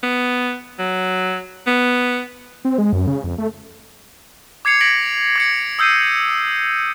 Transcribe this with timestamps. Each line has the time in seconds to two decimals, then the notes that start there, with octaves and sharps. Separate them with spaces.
0.03 B3
0.79 F#3
1.67 B3
2.65 C4
2.78 G#3
2.93 F#2
3.07 C#3
3.24 F2
3.38 A3
4.65 D6 G#6 C7 C#7 F7
4.81 G#6 A#6 B6 C#7 D7 F#7
5.36 D6 G#6 C#7
5.79 D#6 E6 G6 C7 D#7